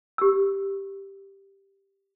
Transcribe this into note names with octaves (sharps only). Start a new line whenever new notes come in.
G4 E6